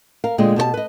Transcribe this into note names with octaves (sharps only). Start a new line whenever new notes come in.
A#4 F5
A#2 D3 G#3 D#5 G5
B2 G4 C5 A5
B4 D#5